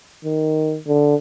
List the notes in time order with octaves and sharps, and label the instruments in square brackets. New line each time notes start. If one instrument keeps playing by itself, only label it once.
[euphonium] D#3
D3